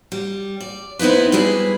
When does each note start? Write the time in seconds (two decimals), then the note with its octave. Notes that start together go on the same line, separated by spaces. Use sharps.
0.12 G3
0.60 D5
0.99 B3 C4 D#4 E4 B4
1.32 G3 G#3 E4 G#4 B4